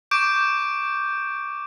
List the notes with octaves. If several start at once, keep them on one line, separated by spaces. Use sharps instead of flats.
C#6 D6 G6 D7